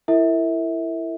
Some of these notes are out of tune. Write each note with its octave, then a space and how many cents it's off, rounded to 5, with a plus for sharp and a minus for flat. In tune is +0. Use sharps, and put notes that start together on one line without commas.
E4 +15 A#4 -40 E5 -25